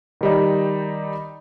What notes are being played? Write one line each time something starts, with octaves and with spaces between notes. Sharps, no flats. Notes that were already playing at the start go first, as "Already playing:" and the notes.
D#3 G3 D#4